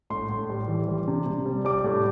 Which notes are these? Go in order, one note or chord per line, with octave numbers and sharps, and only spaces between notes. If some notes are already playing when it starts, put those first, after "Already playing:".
A2 C6
A2
G3
E3
G3
C3
C3
G3
G3 D6
A2